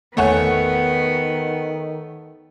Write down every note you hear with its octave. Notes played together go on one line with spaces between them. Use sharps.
G1 E2 D#3 A3 B3 C#5 F#5 G#5